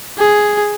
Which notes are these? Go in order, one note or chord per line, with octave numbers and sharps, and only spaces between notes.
G#4